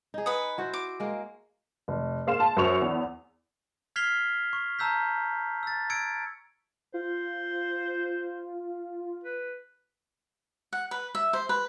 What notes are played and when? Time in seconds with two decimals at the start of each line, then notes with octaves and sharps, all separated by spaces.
0.14 D#4 G#4
0.26 B4 F#5 D#6
0.58 E4 F#4 C5
0.73 D6
1.00 G#3 A#3
1.88 F1
2.27 A#3 G#4 F5 C6 E7
2.40 A5
2.57 F#2 C5 C#6 F7
2.82 E2
3.96 F6 G#6 B6 C7 F7 G7
4.53 C#6
4.79 A5 A#5 E6 G6 B6
5.63 E6 A6
5.90 E6 G#6 C#7 D7
6.94 F4 C5
9.24 B4
10.73 F#5
10.91 B4
11.15 E5
11.33 C5
11.49 B4